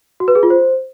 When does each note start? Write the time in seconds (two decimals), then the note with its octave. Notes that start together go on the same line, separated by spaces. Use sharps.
0.20 F#4
0.28 B4
0.35 G#4
0.43 F4
0.50 C5